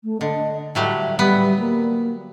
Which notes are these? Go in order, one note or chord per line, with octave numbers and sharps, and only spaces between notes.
A3
D3 D#5
A2 F#3 G3 E5
G3 B3
A#3